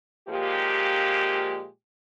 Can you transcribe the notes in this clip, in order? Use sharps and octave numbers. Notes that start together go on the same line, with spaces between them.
A#2 F3 G#3 A#3 G4